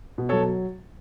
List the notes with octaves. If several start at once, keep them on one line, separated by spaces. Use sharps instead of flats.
B2
F#3 A4 C#5